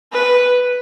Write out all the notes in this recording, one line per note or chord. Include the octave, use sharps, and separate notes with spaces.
B4